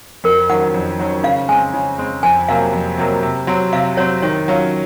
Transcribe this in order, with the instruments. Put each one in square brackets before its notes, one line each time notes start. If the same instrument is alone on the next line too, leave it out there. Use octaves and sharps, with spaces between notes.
[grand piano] F2 [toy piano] A#4
[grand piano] D#3 F#3 C#4 [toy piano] F#5
[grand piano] F2
D#3 F#3 C#4
[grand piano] C#3 [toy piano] F5
[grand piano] G#3 C4 [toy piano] G#5
[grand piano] C#3
G#3 C4
[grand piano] F2 [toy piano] G#5
[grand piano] C3 F#3 A#3 [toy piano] F5
[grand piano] F2
C3 F#3 A#3
C3
F#3 C4
[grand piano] C3 [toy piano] F5
[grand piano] F#3 C4 [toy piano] C#5
[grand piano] D#3 [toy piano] C#5
[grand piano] F#3 C#4 F4